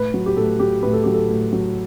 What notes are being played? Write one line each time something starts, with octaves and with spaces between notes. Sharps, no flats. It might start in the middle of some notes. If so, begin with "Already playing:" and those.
Already playing: A2 B4
F#3
G4
A2 A4
F#3 G4
A2 B4
A4
F#3 G4
A4
A2
F#3